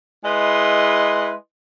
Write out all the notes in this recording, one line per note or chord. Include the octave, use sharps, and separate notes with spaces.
G#3 E4 B4 D#5 C6